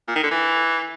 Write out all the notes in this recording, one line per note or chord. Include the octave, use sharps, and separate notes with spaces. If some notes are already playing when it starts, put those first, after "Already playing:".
A#2
D#3
D3
E3